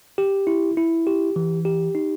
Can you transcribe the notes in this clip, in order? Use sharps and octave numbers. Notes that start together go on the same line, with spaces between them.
G4
E4
E4
G4
E3
G4
D#4